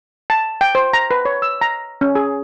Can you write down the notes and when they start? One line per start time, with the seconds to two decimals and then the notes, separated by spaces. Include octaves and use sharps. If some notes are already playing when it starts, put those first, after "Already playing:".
0.30 A5
0.61 G5
0.75 C5
0.93 A#5
1.11 B4
1.25 C#5
1.42 E6
1.61 A#5
2.01 C#4
2.15 G#4